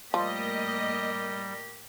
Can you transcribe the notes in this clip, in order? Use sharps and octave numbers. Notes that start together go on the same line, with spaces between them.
A2 F3 G3 A#3 G4 A#4 D#5